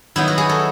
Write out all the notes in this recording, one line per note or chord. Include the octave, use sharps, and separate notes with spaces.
D#3 F#3 B3 D#4 E4
F#4
G#4
A4